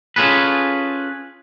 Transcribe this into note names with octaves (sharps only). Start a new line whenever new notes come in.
C#4 F4 G#4 A4 B4